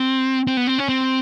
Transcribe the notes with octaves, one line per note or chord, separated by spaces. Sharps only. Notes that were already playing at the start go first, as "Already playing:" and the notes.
Already playing: C4
C4
B3
C4
C#4
C4